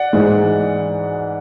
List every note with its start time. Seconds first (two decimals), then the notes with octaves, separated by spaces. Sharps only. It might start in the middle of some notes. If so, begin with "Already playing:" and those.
Already playing: D5 F#5
0.13 G#2 E3 G#3